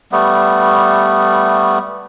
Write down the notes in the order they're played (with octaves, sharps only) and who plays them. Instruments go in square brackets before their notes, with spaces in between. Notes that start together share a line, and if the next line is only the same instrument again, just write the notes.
[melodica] G3 A3 B3